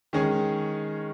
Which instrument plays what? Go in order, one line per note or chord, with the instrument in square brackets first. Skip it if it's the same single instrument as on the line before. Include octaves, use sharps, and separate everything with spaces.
[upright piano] D#3 G#3 C#4 G#4